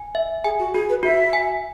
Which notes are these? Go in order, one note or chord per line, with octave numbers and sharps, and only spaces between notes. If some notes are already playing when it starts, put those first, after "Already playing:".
Already playing: G#5
E5
G#4 G#5
F#4
F#4 G#4
B4
F#4 E5
G#5